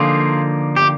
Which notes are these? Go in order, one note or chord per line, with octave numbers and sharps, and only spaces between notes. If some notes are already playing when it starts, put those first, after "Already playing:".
Already playing: D3 F3 A#3 D#4 F4 G#4
G4